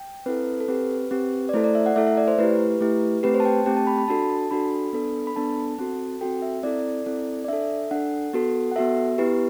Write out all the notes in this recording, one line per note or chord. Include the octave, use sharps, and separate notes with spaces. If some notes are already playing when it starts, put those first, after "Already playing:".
Already playing: G5
C4 E4 A4 B4
A4
C4 G4 B4
C4 G4
D5
A3 E4 A4 C5
D5
E5
F#5
A3 E4 A4 E5
E5
D5
C5
A3 E4 G4 B4
A3 E4 G4
A3 C4 G4 B4
C5
A5
G5
A3 C4 G4 G5
A5
B5
B5
D4 F#4 A4 A5
A5
D4 F#4 A4 B5
B3 D4 A4
B5
B3 D4 A4 A5
C4 F#4 A4
C4 F#4 A4 G5
E5
C4 E4 A4 D5
C4 E4 A4
D5
D4 A4 E5
D4 A4 F#5
B3 F#4 A4
F#5
B3 F#4 A4 E5
B3 E4 G4 B4